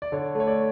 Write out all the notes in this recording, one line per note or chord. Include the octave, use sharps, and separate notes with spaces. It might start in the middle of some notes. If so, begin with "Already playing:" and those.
D5
D3 C#5
A3 C#5
D5